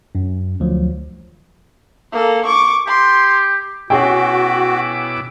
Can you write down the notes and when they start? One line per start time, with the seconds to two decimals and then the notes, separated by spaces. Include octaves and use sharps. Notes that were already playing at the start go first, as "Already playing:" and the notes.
0.15 F#2
0.60 D2 F3 F#3
2.12 A#3 A4
2.45 C#6 D6
2.87 G4 C6
3.90 B2 C#4 E4 F#4 G#4 G5 D6